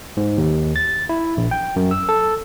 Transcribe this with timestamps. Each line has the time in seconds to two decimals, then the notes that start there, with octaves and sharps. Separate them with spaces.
0.17 G#2
0.37 D#2
0.76 A6
1.09 E4
1.37 A#1
1.51 G5
1.76 F#2
1.91 E6
2.09 A4